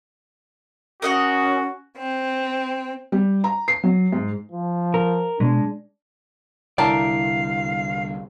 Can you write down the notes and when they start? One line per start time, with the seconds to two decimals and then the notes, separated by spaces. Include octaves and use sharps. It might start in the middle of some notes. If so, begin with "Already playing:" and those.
1.02 C#4 F#4 A#4 D#5 F#5
1.98 C4
3.12 G3
3.44 A#5
3.68 C7
3.84 F#3
4.12 G#2
4.52 F3
4.94 A#4
5.40 B2 G#3 D4
6.78 C2 D3 E4 A#4 D5 F5 A5